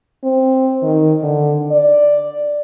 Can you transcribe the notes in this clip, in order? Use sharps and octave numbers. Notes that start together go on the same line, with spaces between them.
C4
D#3
D3
D5